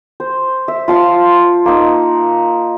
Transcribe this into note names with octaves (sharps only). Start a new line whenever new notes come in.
C5
E5
F4 A5 C6
A#3 D#4